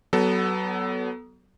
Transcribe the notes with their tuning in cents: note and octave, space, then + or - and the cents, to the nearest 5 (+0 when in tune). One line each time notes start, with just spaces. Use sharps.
F#3 +30 B3 +0 A4 +0